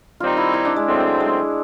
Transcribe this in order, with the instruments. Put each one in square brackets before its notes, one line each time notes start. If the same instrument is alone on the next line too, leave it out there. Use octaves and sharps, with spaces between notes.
[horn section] D#3 G3 C4 D#4 [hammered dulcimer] F4
[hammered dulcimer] E4
E4
D4
G#3
[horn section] C#3 F#3 A3 C4
[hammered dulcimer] G#3